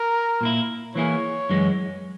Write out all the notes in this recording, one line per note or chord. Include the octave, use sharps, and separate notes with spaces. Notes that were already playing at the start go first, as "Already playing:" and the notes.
Already playing: A#4
A#2 A#3 E4
E3 A#3 E4 G#4 C#5
F#2 E3 G#3 C#4